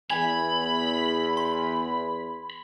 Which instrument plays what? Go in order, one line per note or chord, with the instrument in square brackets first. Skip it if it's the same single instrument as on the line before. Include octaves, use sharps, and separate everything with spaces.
[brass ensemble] E2 [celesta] G#5 [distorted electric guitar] B5 [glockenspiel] G#6
[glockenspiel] C6